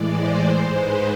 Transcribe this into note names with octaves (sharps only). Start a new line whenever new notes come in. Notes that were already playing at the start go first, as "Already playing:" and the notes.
Already playing: A2 E3 G#3 D5
C5
G#2 G#3
B4